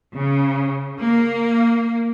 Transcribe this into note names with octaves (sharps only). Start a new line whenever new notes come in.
C#3
A#3